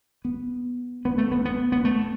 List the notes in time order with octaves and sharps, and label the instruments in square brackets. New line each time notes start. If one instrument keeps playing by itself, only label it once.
[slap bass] B3
B3
A3
B3
B3
B3
A3